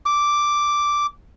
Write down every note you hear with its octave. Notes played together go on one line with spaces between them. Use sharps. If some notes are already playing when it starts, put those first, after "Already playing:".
D6